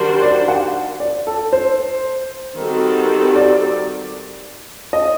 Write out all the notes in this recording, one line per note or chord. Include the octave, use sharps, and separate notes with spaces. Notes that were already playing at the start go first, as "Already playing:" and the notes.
Already playing: D#3 G3 D4 F#4 C5
D5
F#5
D5
A4
C5
D#3 G3 C4 F#4 A4
D5
D#5